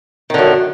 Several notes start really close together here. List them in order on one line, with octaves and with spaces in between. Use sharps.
D#3 D3 F#2